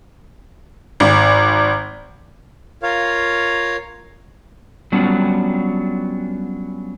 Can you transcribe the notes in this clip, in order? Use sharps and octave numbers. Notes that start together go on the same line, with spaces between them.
G#1
F4 A#4 C#5 F5
F#3 G3 B3 C#4 D4 F4